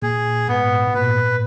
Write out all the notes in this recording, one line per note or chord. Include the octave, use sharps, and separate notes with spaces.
A#2 G#4
G#2 B3
B2
A#2 B4